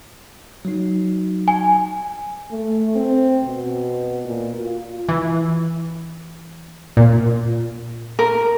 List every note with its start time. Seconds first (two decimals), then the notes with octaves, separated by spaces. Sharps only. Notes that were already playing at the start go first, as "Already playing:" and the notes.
0.65 F#3 D#4
1.48 G#5
2.51 A3
2.95 C4
3.44 B2
4.25 A#2
4.59 F4
5.09 E3
6.97 A#2
8.19 A#4